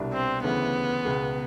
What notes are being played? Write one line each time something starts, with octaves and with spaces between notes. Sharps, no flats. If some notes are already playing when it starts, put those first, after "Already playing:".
Already playing: C2 B2 G3 B3 D4
C4
D2 C#3 E3 B3
C#2 B2 G#3